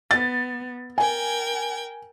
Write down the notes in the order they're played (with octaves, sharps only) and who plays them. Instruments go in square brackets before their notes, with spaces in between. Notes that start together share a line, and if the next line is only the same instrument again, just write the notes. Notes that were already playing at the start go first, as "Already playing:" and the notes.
[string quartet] B3 [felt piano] A6
[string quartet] A#4 G5 G#6 [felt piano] G#5